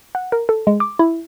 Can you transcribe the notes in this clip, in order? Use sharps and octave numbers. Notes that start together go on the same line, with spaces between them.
F#5
A#4
A4
G#3
D6
E4